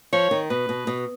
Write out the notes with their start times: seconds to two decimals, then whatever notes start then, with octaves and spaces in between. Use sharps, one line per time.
0.13 F3 C#5
0.31 D#3
0.50 B2 B4
0.69 B2
0.87 B2